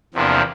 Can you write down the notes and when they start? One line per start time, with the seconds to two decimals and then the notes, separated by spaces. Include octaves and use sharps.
0.14 E2 C3 F3 A#3 D4